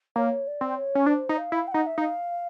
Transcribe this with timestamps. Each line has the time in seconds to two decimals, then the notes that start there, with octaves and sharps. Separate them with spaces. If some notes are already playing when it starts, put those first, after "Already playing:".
0.16 A#3 C#5
0.47 D5
0.61 C4
0.76 C#5
0.95 C#4
1.06 D4 C5
1.29 D#4
1.37 F5
1.52 E4
1.67 G5
1.71 D#4 F#5
1.86 E5
1.97 D#4 F5